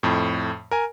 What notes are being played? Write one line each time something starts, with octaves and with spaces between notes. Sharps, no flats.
F2 A2
A#4 G#5